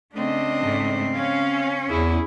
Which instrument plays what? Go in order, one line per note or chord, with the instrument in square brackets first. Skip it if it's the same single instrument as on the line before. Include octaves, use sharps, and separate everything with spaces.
[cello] C#3 C4 [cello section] A3 [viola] D4 D#5
[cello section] G#2 A3
[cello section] C#4 [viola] F5
[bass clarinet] E2 [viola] E4 G#4